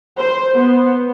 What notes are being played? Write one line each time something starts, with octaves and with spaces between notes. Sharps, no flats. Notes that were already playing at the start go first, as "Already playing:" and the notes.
C5
B3